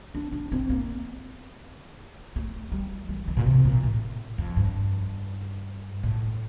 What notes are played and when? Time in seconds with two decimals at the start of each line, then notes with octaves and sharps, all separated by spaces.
0.15 D4
0.32 D4
0.52 C4
0.70 A#3
2.36 A3
2.72 G3
3.09 E3
3.28 E3
3.37 A#2
3.46 C3
3.65 A#2
3.83 A2
4.38 F2
4.56 G2
6.03 A2